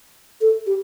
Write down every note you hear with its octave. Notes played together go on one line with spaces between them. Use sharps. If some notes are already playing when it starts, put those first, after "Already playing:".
A4
G4